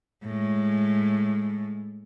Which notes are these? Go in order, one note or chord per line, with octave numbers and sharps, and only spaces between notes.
A2 G#3